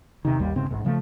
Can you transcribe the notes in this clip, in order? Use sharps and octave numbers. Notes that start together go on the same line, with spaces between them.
E2 C3 D#3
G#1 D#2 G3
E1 G#2 C#3 C4
A1 E2 G#2
C#3 F3 G#3 A3